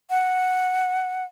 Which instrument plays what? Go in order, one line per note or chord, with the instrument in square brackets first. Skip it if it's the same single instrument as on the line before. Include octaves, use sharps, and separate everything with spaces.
[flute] F#5